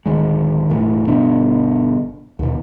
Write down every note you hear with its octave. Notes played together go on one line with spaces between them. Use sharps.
D1 D#2 D#3 G#3
E1 A2 E3
G1 G2 B2 D4
D#2 B2